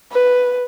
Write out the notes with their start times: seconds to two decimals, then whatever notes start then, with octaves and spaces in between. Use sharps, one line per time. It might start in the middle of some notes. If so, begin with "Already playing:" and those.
0.12 B4